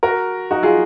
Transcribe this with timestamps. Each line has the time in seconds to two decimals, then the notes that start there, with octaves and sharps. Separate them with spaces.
0.03 F#4 A#4
0.51 D#4 F#4
0.63 F4 G#4